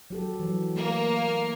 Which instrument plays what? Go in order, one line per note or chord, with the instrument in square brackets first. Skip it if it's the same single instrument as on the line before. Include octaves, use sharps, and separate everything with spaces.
[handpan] F#3 G4 A4
E3 F#3
[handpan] A3 [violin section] A#3